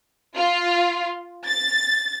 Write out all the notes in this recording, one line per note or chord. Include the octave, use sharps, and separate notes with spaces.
F4
A6